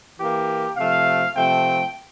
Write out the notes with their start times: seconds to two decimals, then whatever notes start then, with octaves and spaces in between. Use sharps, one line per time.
0.19 E3 A#3 G4
0.76 C3 F3 A3 F5
1.35 C3 F3 A3 C4 G5